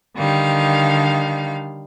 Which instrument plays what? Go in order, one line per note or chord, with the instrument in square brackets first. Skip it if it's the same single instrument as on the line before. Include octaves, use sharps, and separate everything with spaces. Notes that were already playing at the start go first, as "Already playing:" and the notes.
[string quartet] D3 D#3 G3 F5